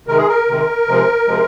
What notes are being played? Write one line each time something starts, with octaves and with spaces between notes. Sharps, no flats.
C3 D#3 G#3 A#4
G#4
A#4
C3 D#3 G#3
C3 F3 G#3
C3 F3 G#3